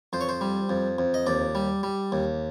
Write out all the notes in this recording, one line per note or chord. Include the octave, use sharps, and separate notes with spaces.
F2 C5
C#5
C5
G3
F2
F2
D#5
D#2 D5
G3
G3
D#2